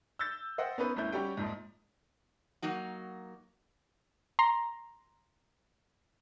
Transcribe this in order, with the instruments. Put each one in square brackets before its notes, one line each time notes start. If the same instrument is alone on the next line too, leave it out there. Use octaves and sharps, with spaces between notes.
[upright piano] E6 G6 A6
C5 D#5 F#5 G5
B3 C#4 D#4 B4 C5
G1 D2 C#4 E4 G6
G3 C#4 F#4 G4 G5
A#1 F2 G#2
[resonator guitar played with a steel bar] F#3 A#3 D#4 F#4
[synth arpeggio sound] A#5 C6